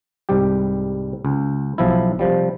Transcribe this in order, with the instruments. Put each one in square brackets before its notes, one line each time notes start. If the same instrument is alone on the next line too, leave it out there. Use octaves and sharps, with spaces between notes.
[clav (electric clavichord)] C2 G#2 G3 G4
C#2
B1 F3 E4
C3 F3 G3